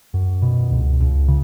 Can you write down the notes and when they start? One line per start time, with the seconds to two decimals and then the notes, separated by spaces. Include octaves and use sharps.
0.14 F#2
0.42 B2
0.71 C#2
1.00 C#2
1.28 C#3